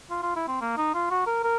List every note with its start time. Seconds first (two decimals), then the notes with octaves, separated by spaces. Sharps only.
0.11 F4
0.23 F4
0.36 E4
0.48 C4
0.61 A#3
0.77 D#4
0.94 F4
1.11 F#4
1.27 A#4
1.44 A#4